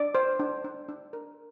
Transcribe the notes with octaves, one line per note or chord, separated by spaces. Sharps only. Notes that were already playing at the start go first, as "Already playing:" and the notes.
Already playing: D4 D5
C5
D4
D4
D4
A#4